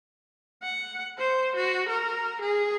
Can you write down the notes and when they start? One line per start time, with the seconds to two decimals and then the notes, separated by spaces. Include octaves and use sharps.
0.63 F#5
1.18 C5
1.56 F#4
1.88 A#4
2.41 G#4